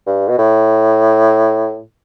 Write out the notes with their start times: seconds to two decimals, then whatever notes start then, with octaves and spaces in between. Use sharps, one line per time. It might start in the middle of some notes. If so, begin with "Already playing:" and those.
0.06 G2
0.28 B2
0.38 A2